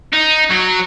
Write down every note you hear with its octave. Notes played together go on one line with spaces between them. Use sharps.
D#4
F#3